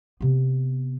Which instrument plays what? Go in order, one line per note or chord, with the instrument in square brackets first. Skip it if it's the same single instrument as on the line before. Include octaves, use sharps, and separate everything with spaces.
[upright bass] C3 B3